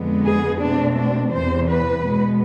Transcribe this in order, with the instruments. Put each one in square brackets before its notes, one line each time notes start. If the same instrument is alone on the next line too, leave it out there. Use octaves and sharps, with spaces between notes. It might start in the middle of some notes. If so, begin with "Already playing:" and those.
Already playing: [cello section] F2 D3 G#3 B3
G#4
B2 A3 C4 D4
D4
E2 C3 E3 C5
B4
B2 G#3 B3